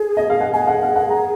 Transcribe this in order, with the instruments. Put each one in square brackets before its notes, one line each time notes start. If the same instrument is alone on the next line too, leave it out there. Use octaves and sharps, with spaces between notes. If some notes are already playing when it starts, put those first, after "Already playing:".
Already playing: [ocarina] G#4
[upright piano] D#5
F5
F#5
[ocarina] G#4 [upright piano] G#5
[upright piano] F#5
F5
F#5
A#5